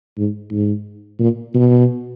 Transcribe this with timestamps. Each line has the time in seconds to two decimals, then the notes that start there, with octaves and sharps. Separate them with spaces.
0.17 G#2
0.51 G#2
1.19 A#2
1.54 B2